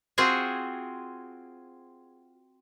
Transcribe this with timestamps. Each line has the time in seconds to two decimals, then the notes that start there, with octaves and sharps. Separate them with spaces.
0.18 C4 F4 F#4 G#4